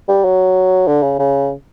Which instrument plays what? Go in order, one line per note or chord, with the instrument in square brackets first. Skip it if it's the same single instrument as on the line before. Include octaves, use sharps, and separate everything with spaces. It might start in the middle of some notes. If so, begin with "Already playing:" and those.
[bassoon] G3
F#3
D3
C#3
C#3